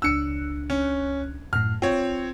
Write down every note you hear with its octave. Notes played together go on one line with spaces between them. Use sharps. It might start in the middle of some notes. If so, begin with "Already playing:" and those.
C#2 D4 E6 F#6 C#7
C#4
F#2 A2 F6
C4 F4 C#5